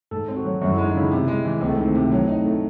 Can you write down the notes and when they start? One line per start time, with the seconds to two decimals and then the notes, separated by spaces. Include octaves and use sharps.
0.11 G#2 A4
0.28 C4
0.37 F#4
0.45 F#3
0.62 F#2 F#4
0.72 E4
0.78 G#3
0.84 D#4
0.95 C#3 E4
1.11 C3
1.28 G#3
1.45 E3
1.61 C#2 C4
1.69 A3
1.76 D#3 C4
1.95 C3
2.12 F#3
2.28 D#4
2.45 A3